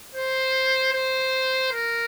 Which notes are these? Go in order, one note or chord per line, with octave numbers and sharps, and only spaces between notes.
C5
C5
A#4